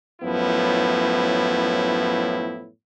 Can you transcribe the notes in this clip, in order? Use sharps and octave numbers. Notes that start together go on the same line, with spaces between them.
F#2 A2 F3 B3 E4